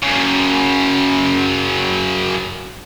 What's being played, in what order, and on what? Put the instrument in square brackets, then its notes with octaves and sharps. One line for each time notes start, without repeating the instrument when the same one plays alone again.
[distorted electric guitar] F#2 C#3